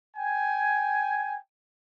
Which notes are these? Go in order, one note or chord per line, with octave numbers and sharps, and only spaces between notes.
G5 G#5